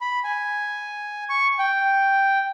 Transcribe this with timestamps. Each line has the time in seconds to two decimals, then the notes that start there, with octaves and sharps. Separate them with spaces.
0.01 B5
0.24 G#5
1.29 C#6
1.59 G5